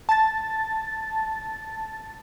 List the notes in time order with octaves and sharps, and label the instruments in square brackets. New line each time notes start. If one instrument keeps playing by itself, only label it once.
[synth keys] A5 A6